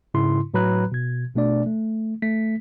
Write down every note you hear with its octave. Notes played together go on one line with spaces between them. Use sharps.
G#2 C#3 E4 C6
A2 F#3 B4 A#5 B5 F#6
B2 G#6
G#1 B2 A3 D4 D5
A3
A3 B6